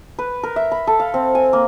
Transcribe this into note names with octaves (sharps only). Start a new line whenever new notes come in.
B4
A#4
E5
B5
A4
F5
C4
G#5
A#3